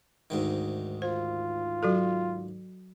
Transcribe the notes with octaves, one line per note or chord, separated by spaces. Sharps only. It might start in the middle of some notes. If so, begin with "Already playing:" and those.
D2 G#2 D#3
F4 C5
F#3 F#4 A4